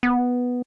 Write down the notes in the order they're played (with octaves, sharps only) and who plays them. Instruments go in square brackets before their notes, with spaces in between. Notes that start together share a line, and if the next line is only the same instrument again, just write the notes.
[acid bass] B3